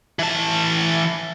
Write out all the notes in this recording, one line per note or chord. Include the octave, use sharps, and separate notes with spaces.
E3 A5